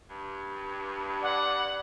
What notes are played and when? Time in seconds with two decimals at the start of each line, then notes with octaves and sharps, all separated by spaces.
0.10 G2
1.23 D5 F#5